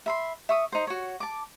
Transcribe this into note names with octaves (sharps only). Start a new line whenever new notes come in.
E5 B5 C6
E5 C#6 D#6
D#4 C5
F#4 C#5
A5 D6